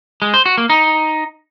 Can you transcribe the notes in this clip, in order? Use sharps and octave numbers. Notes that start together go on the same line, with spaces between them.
G#3
C5
F#4
A#3
D#4